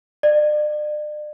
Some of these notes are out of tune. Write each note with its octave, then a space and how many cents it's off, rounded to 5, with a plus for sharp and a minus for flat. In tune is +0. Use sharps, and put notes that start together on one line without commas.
D5 +40